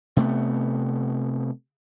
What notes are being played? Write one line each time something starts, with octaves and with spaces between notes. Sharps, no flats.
C3 A3 B3